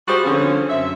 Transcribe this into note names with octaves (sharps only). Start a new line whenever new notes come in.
G3 F4 F#4 G#4 C5
D3 F3 C4 C#4
F#2 C4 E5